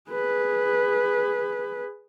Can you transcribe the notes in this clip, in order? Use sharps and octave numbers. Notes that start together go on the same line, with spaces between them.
G#4 B4